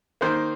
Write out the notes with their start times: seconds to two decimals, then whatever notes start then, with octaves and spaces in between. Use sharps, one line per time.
0.21 D#3 A#3 C5